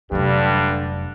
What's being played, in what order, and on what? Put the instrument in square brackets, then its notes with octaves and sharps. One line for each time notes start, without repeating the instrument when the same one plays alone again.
[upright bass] F1 F#3 [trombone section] G2 D3 G3